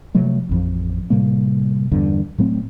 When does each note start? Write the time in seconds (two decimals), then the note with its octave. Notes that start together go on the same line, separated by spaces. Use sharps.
0.15 C3 F3 F#3 A3
0.49 A1 F2 F3
1.10 A2 C3 G3 A#3
1.91 E2 G2 D3
2.38 A2 F#3 A3 C4